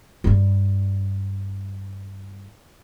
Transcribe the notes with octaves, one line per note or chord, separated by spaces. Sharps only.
G2 G3